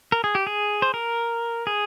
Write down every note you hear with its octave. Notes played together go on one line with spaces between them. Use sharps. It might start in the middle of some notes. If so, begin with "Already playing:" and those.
A#4
G#4
G4
G#4
C5
A#4
G#4